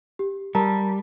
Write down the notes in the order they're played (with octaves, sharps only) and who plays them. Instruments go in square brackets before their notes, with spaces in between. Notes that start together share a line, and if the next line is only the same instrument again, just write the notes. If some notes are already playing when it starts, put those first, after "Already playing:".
[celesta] G4
[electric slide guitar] G3 [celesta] A#4 A5 A#5